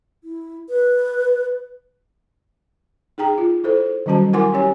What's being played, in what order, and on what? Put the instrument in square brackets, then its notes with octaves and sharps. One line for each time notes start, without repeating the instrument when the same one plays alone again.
[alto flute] E4
B4
[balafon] D#4 G#4 G5 A#5
F4
E4 A4 C5
D#3 F#3 G3 C#4 F#4 A5
E4 A#4 F#5 G#5 C6 D6
C#4 G4 C#5 G#5